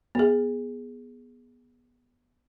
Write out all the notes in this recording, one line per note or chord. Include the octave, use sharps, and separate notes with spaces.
B3 G#4